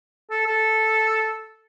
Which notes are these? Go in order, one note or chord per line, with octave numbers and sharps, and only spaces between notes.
A4
A4